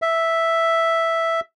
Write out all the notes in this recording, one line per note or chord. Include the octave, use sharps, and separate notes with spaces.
E5